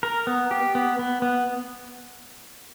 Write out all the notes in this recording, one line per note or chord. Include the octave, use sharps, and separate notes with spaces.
A#4
B3
G4
B3
B3
B3